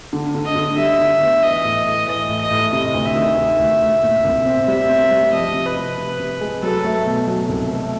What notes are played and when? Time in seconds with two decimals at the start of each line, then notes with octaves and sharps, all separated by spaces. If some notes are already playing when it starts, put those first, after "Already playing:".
0.13 D3
0.35 D3
0.45 D#5
0.56 D3
0.77 G3 E5
0.99 D3
1.21 B3
1.42 E3 D#5
1.64 A2
1.86 A2
2.08 E3 D#5
2.29 A2
2.40 D#5
2.51 A2
2.73 C3 D#5
2.94 D2
3.05 E5
3.16 D#3
3.38 D#3
3.59 D2
3.81 D2
4.03 A#2
4.25 C2
4.46 C4
4.68 G3 E5
4.89 C4
5.11 G3
5.32 F3 D#5
5.54 C3
5.66 B4
5.76 C3
5.97 C3
6.20 C3
6.41 G#3
6.62 F#3 A4
6.85 A3
7.06 B2
7.27 F#3
7.49 C2
7.71 A3